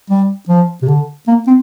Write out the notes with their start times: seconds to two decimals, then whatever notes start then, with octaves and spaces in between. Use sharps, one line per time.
0.10 G3
0.49 F3
0.82 C3
0.88 D3
1.27 A#3
1.47 C4